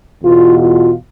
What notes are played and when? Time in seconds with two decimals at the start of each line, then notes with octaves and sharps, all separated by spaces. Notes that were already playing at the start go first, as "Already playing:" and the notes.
0.21 E2 B2 F4
0.58 F4